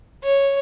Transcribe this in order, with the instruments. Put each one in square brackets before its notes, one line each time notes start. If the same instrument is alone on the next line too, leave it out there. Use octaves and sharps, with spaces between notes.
[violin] C#5